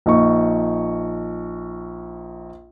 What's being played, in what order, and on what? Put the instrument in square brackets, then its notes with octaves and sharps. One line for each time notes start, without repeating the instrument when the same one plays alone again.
[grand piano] A#1 D#4 C#6